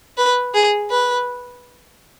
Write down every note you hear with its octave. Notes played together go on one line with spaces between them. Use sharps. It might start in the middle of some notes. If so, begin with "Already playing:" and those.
B4
G#4
B4